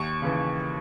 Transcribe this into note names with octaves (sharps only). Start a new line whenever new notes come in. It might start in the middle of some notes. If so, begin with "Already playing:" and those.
Already playing: D#2 C#6
C#3 E3